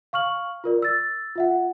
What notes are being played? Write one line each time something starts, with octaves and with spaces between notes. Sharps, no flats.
F5 C#6 F6 F#7
F4 A#4 D5
E6 A6
F4 E5 F#5